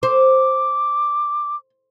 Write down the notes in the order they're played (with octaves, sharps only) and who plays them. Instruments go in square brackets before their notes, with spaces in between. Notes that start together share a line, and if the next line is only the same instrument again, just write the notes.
[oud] C5 [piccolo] D6